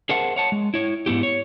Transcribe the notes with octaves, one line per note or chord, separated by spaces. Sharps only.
G#4 A#4 C5 E5 F#5 A5
C#5 F#5 A5
G#3
E4 C#5
G#2 B3 E4 G4
C#5